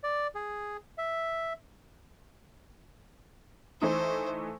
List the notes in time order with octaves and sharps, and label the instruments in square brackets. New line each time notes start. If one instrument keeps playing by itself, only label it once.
[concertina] D5
G#4
E5
[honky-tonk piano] E3 A3 D#4 [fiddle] C5